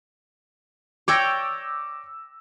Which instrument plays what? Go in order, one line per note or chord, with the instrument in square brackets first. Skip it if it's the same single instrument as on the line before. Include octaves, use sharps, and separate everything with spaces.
[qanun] C#5 D5 G5 [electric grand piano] D6 E6 A#6